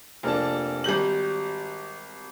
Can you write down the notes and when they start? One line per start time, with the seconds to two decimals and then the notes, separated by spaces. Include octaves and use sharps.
0.23 F1 A#3 D4 A5
0.84 G#1 G3 G6 F#7